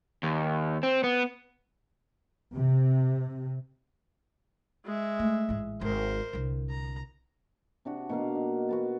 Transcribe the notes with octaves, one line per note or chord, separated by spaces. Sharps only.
D#2
C4
B3
C3
G#3 E5
A3
A1 G#2
G#1 A#4 C5
C2 D3
A#5
C3 D4 F#4
B2 A#3 F5
D#4
F#4 B4 A5